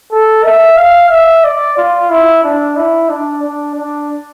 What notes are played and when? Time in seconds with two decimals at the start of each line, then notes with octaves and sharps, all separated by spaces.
0.11 A4
0.45 E5
0.77 F5
1.10 E5
1.44 D5
1.77 F4
2.10 E4
2.44 D4
2.76 E4
3.09 D4
3.43 D4
3.75 D4